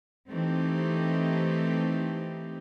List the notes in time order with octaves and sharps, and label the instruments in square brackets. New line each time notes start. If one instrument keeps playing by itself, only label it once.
[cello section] E3 A3 C4 D#4 G4